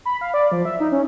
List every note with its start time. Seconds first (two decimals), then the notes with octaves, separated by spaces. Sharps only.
0.05 B5
0.21 F5
0.34 D5
0.52 F3
0.65 E5
0.80 D#4
0.92 C#4